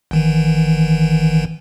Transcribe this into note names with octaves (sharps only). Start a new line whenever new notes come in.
G1 D#3 E3